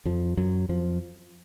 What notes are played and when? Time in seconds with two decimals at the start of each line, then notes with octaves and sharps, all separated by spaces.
0.05 F2 F3
0.37 F#2 F#3
0.69 F2 F3